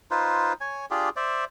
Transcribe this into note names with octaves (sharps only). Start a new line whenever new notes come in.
D#4 F4 B4 C5
C#5 G#5
D4 F4 G4 G#4
C5 D5 E5